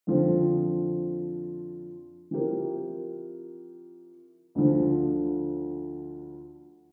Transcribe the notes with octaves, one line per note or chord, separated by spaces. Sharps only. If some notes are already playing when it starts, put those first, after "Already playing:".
F2 D3 F3 C4 F4
F3 C4 E4 G4 A#4
D2 D3 F3